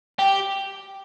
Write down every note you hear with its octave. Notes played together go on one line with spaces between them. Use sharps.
G4